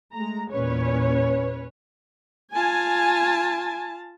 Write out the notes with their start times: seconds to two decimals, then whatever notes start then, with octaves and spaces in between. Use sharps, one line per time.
0.14 G#3 A3 A#5
0.51 E2 A#2 C#4 B4 C#5
2.55 F4 G#5 A5